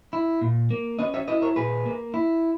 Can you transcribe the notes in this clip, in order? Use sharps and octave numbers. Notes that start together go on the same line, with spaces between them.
E4
A#2
A#3
C#4 B4 D#5
C#5 E5
E4 B4 D#5
A#4 C#5
A#2 G#4 B4
A#3
E4